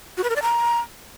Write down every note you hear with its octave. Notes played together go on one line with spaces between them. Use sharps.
F#4
B4
A#4
D5
A#5